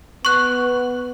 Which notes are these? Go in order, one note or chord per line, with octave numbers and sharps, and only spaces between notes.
B3 C#6 F#6